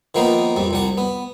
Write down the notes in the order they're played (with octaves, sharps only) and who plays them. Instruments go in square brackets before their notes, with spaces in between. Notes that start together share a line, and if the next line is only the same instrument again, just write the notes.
[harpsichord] D#3 F3 A#3 B3 D#4
F2 G3
C2 G3 F#5
B3